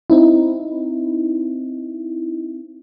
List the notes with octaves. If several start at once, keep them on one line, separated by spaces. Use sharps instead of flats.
C4 D#4 E4